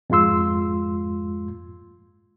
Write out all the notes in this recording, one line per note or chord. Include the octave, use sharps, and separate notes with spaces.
F2 G#2 G#3 F4 C6 E6